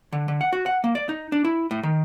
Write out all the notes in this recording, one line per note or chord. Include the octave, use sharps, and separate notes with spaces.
D3
D3
F#5
F#4
F#5
A#3
D5
D#4
D4
E4
A2
D#3